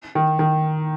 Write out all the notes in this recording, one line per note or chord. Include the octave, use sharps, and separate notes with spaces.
D#3
D#3